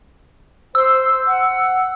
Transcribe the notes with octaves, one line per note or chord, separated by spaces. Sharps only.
C5 E6
F#5